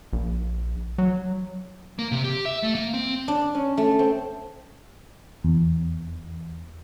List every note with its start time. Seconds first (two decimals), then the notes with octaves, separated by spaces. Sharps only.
0.13 A#1
0.98 F#3
1.99 A#3
2.12 C3
2.24 G4
2.46 E5
2.63 A3
2.75 A#3
2.94 C4
3.28 D4
3.55 C#4
3.77 A3
3.99 C4
5.44 E2